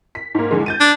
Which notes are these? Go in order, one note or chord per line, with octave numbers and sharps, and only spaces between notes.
B6
G#2 A#3
E2 D3 G#3
G6 A6 D#7
D4